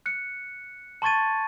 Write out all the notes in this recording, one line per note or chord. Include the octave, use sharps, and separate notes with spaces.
F#6 C#7
A5 C6 C#6 G#6 A6 D#7